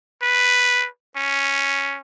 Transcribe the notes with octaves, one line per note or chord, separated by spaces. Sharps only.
B4
C#4